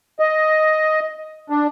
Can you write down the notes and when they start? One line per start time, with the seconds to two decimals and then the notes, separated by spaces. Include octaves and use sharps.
0.19 D#5
1.50 D4